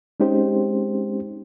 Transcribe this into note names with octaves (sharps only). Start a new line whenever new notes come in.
G#3 C4 C#4 D#4 G4 C5